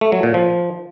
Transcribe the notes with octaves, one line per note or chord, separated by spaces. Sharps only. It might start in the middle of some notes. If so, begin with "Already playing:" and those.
A3
F#3
A#2
F3